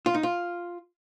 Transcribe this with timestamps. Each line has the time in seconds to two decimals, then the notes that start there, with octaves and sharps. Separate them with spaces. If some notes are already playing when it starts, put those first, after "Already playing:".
0.06 F4
0.15 D#4
0.23 F4